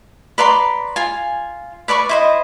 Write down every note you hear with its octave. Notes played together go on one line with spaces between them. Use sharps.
B4 D5 A#5 C6
F4 G#5
B4 D5 B5 C#6
E4 C5 D#5